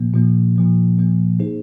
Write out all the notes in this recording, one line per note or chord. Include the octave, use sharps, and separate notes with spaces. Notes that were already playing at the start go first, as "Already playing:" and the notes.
Already playing: A#2 F3 A#3
A#2 F3 A#3
A#2 F3 A#3
A#2 F3 A#3
A#3 D#4 G#4 C5